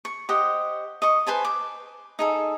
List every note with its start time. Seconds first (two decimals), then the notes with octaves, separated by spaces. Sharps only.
0.05 C#6
0.29 G4 C5 D#5 F#5
1.02 D#5 C#6
1.27 B4 C5 G#5 A5
1.45 D6
2.19 D#4 G#4 A4